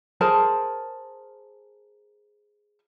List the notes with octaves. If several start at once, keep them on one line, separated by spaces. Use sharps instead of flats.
G#4 A#4 C5 A5